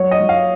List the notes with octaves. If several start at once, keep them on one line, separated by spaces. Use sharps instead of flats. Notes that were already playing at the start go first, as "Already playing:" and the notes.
Already playing: F#3 C#5
D#5
F#3
F5